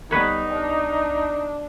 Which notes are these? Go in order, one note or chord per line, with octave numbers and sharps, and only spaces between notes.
B1 G3 B3 D#4 B4 C#5
D4